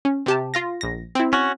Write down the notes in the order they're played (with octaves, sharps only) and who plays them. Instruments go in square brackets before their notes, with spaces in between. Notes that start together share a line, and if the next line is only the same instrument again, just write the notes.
[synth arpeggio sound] C#4
C3 G4 A5
F4 F5 A#6
A#1 A#6
C4 E4
[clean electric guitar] C#4 F#4